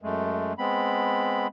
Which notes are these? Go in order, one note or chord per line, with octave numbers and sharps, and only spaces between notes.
F#2 G#3 A3
G#3 B3 C4 B5